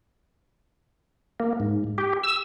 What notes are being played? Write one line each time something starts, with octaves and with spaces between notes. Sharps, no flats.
A#3
G#2
G4
E6